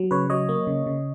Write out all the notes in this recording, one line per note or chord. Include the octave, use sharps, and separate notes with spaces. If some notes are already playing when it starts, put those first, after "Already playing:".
Already playing: F#3
C#3 B4 C#5
F#3 C#5 D#5
A#3
C#3
C#3